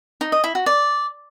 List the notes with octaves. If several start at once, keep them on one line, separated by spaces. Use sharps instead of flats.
D#4
D#5
E4
F#4
D5